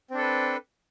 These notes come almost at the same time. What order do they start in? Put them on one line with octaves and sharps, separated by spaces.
C4 D4 A4 B4